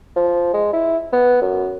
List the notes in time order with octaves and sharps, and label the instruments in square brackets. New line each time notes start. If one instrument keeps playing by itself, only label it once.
[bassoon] F3
G#3
E4
B3
F#2